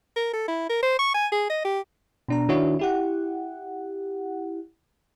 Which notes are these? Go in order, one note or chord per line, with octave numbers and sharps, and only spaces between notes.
A#4
A4
E4
A#4
C5
C#6
G#5
G#4
D#5
G4
B2 D4 A#5
D#3 D4 E4 F#4 C#5
E4 G4 F#5